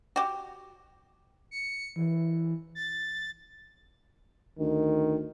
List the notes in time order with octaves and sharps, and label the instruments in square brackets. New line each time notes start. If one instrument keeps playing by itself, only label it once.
[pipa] F#4 G4
[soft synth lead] C#7
E3
A6
[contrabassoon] D2 [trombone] D#3